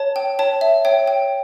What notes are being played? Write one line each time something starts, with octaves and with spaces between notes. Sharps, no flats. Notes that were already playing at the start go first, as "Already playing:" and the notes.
Already playing: C#5 A5
G5
C#5 A5
E5
C#5 G5
G5